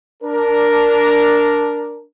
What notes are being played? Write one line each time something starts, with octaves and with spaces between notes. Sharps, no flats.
D4 A#4